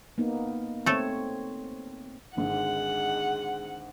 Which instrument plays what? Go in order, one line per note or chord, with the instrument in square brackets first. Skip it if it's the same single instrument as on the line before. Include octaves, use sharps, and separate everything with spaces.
[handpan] A#3 B3 D#4
[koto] A3 A4 [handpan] C4 C#5
[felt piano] G#1 G#2 D3 [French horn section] D#4 G#4 [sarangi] F#5